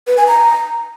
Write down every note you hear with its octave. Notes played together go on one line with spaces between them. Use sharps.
B4
G#5
A#5